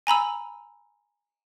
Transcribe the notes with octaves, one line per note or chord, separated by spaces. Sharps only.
G#5 A#5 B5 E6